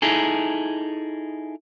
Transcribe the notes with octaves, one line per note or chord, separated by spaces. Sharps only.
D#4 E4 G#4 A4